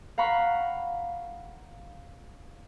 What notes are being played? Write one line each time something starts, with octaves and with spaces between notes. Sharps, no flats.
F5 F#5 A#5 B5 C#6